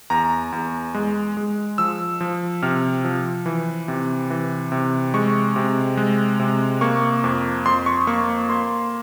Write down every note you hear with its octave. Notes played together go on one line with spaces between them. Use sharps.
E2 A#5
E2
G#3
G#3
F3 E6
F3
C3 F6
F3
E3
C3
E3
C3
G#3 C#6
C3
G#3
C3
A#3 C#6
F2
F2 C6
C#6
A#3 C#6
A#3 C6